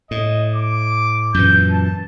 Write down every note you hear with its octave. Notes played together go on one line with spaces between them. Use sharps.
A2 D#5
D6
F#2 A#2 E3 G6
A5